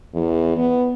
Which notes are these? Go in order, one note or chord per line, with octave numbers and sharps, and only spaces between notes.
E2
B3